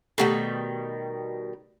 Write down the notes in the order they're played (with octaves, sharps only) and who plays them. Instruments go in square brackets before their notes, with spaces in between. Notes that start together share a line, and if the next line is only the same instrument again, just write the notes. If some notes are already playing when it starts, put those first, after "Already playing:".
[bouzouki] B2 D#3 G3 [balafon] A3 G4 A4